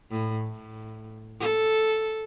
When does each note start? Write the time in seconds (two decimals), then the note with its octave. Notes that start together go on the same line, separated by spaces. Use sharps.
0.10 A2
0.46 A2
1.40 A4